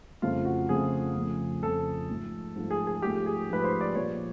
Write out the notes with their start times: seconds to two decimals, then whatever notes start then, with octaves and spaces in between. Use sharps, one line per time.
0.22 F2 C#3 F3 A3 F4
0.45 F#4
0.69 F2 C#3 F3 A3 G#4
1.16 F2 C#3 F3 A3
1.62 F2 C#3 F3 A3 A4
2.09 G#2 F3 A3
2.55 G#2 F3 A3
2.70 G#4
2.87 G#4
3.02 G#2 F3 A3 G4
3.26 G#4
3.49 G#2 F3 A3 B4
3.64 C5
3.81 D5
3.95 A#2 F3 G#3 B3 C#5